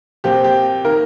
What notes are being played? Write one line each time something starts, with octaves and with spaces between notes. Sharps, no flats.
A#2 F3 C4 G4
G4
D#3 A#3 A#4